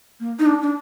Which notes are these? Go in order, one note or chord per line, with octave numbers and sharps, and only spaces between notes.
A#3
D#4
D4
D4